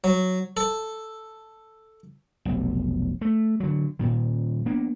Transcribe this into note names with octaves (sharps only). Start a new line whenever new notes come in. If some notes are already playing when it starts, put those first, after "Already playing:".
F#3
A4
F1 B1
A3
D3 F#3
D#1 A#2 D#3
A#3 B3 D4